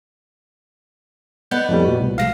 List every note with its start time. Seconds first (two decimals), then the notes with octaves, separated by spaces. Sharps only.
1.51 B3 B4 D5 D#5 F#5 G6
1.69 F2 A2 G3
1.85 A#2 F#4
2.00 C2
2.18 F3 F#3 A3 F5 A#6